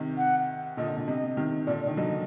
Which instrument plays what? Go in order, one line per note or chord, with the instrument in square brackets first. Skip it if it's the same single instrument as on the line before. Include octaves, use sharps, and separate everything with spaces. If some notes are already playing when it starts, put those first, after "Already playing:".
Already playing: [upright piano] C3 D#3
[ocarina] F#5
[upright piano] A#2 D3 [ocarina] D#5
[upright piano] A#2
[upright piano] C3 [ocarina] D#5
[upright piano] C3 D#3
[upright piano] A#2 D3 [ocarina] D5
[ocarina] D5
[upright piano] D#3
[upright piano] D3 F#3 [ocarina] D#5